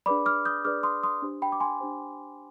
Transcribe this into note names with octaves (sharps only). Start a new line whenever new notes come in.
D4 G#4 B4 D5 B5 D6
D6 F6
D#6 G6
D4 G#4 B4 D5 D6 F6
C6 D#6
C6 D#6
D4 G4 C5
G5 B5
D6
G#5 C6
D4 G4 C5